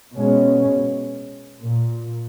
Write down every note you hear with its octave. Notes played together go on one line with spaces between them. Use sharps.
B2 G#3 C#4
A#2